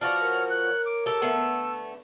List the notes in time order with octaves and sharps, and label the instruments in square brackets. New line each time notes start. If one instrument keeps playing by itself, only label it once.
[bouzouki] F3 B3 F#4 [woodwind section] D5 [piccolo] F6
[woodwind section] A#4 C#5
[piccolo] F#6
D6
[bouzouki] G4 A4 [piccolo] E6
[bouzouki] D3 A3 B3